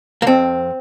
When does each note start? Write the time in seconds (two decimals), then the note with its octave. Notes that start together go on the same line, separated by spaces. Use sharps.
0.22 A#3
0.27 F2 C4